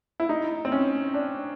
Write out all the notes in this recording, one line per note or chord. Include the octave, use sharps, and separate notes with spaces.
E4
D#4
C4
C#4
D4